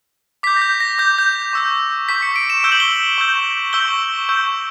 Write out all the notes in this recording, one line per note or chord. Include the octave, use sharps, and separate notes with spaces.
D6 G6 B6
A#6
G6
B6
A#6
D6 G6
G6
C#6 E6 G6
C#6 E6 G6 B6
C#7
D7
E7
C#6 E6 G6 G7
F#7
G7
C#6 E6 G6
C#6 E6 G6 G7
C#6 E6 G6